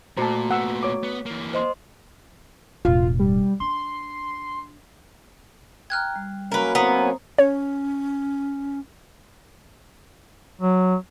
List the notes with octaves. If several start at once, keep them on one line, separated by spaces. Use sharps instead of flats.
A#2 A3 F#4 C5 A5 A#5
A#2 B3 F#5 E6
C#5 D6
B3
E3 A#3
C5 D#5 C6
E1 A2 F4
G3
D4 C6
G5 A#5 F6 F#6 G#6
G3
F#3 A#3 C#4 A#4 B4
B3 C4 E4 C5 A#5 D#6
C#4 C#5
F#3